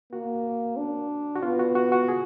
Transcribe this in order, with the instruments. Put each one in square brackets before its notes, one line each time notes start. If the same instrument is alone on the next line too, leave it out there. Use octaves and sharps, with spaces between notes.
[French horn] A#3 [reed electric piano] F#4
[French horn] D4
[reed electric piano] F#4
[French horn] B3 [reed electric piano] F4
[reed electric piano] F#4
F#4
F#4
G#4